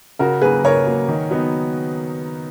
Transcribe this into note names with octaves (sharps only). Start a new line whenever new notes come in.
C#3 F#4 A#4
F#3 A#3 G#4 B4
C#3 A#4 C#5
F#3 A#3
D#3
F#3 B3 D#4